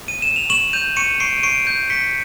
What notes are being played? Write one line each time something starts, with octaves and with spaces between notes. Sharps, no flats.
D#7
E7
F7
C#6 E7 F#7
G6 D#7 F7
C#6 C#7 D#7
C#6 C7 D7
D#7
C#6 C7 D7
G6
C#6 B6 C#7